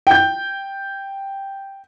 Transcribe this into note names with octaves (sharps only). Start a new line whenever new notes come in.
G5 G6